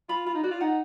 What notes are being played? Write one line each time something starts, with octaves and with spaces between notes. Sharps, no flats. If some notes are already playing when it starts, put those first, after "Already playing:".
F4 B5
F4 B5
D#4
F#4 D5
F4
D#4 F#5